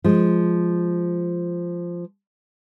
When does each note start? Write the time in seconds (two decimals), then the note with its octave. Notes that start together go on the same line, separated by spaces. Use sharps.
0.04 F3 G#3